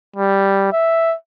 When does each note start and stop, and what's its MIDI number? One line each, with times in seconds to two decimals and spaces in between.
0.16 0.71 55
0.73 1.15 76